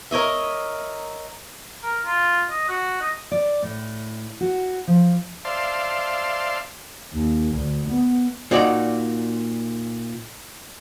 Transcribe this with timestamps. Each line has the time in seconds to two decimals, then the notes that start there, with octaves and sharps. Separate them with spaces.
0.11 A#4 C#5 D#5 E5
1.83 A#4
2.06 F4
2.50 D#5
2.68 F#4
3.01 D#5
3.31 D5
3.62 A2
4.41 F#4
4.88 F3
5.45 C5 D5 E5 F5 A5 C6
7.13 D#2
7.55 D2
7.89 B3
8.51 A#2 D#4 F#4 D5 G5